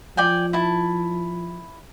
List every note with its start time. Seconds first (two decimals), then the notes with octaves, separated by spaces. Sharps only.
0.17 F3 D5 G5 G#5
0.53 E4 A5